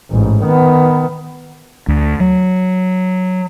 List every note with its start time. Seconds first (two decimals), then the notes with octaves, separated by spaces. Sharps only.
0.11 A1 G#2
0.45 D#3 B3
1.88 D2
2.20 F#3